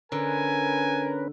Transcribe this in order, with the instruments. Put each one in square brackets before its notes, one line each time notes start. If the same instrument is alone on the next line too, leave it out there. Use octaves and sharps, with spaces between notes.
[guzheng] D3 [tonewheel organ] C#4 B4 [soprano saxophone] A#4 [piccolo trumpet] G#5